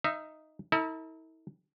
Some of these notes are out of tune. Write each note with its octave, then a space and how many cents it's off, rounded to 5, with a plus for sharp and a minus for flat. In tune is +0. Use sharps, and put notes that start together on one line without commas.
D#4 +0 E5 +25
E4 -40 A4 +40